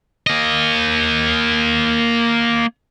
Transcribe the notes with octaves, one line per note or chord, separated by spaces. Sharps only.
A#3 D#5